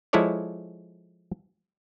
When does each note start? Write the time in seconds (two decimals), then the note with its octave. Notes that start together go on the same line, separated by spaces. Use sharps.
0.13 F3 G#3 E4 A4 C#5 D5